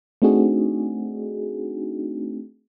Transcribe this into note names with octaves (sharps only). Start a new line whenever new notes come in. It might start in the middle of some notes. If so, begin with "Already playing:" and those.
A3 C4 D4 D#4 F#4 G#4